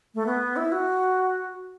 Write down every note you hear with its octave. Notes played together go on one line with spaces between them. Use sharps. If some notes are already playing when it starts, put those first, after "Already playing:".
A3
B3
E4
F#4